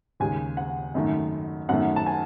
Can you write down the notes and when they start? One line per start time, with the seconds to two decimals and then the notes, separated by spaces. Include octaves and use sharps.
0.20 D#2 C#3 G#3 G#5
0.57 F#5
0.94 G#1 F#2 D#3 A3
1.69 F#2 D#3 A3 F#5
1.96 A5
2.06 G#5